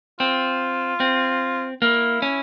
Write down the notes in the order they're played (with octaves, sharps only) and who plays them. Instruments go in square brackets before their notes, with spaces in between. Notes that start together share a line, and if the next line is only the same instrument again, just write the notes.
[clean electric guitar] C4 [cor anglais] F4
[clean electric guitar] C4
[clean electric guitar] A#3 [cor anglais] E4
[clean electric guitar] C#4